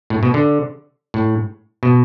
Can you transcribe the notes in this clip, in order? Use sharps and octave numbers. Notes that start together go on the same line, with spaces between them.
A2
B2
D3
A2
B2